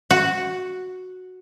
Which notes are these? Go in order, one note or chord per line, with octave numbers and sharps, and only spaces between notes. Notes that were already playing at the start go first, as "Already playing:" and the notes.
F#4